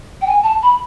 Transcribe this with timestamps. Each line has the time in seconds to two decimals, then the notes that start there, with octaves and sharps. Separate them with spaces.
0.21 G5
0.27 G#5
0.43 A5
0.63 B5